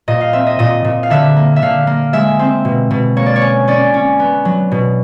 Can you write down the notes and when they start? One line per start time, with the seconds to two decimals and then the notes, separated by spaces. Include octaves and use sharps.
0.08 A#2 D#5
0.21 F5
0.33 C4 E5
0.47 D#5
0.59 A#2 D#5
0.84 A#2
1.03 F5
1.10 D3 E5
1.36 A#3
1.56 E5
1.62 D3 F5
1.87 A#3
2.13 G#3 E5
2.39 C4
2.65 B2
2.91 B2
3.17 A#3 C#5
3.26 D5
3.36 C#5
3.42 C#4
3.68 C#4 D5
3.94 C#4
4.19 B3
4.45 F#3
4.71 B2